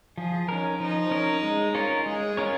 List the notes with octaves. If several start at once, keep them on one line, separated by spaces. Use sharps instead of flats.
F3 G#4
C#4 D#4 A#4
F3 D#4
C#4 A#4
G#3
C#4 F4 A#4 C#5
G#3 G#4
C#4 F4 A#4 C#5